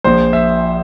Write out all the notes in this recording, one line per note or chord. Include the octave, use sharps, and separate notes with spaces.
A#1 A#2 F3 C5
E5